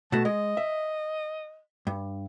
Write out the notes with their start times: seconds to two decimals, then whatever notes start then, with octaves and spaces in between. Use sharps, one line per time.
0.12 B2 A3 F#4 A5
0.25 G#3 D#5
0.57 E5
1.87 G2